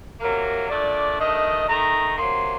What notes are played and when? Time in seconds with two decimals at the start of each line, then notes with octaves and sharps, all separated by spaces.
0.20 C3 F#3 A#3 A#4
0.70 A#2 A3 D4 D5
1.19 G2 D#3 A3 D4 D#5
1.69 D#3 A3 D#4 A#5
2.18 C3 F#3 A#3 C6